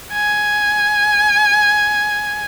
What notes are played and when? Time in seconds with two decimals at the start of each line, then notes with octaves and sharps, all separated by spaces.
0.13 G#5